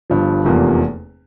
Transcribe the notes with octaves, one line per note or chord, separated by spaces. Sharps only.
G1 G2 F3
F1 E2 C3 F3 A#3